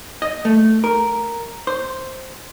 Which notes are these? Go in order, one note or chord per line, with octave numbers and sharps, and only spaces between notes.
D#5
A3
A#4
C5